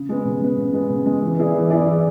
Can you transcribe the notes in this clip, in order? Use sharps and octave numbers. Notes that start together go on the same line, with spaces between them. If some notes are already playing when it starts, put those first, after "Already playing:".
Already playing: C#3
G#3 B3
C#3
G#3 B3
C#3
G#3 B3
C#3
G#3 B3
E3
B3 E4 G#4 D5
E3
B3 E4 G#4 D5
E3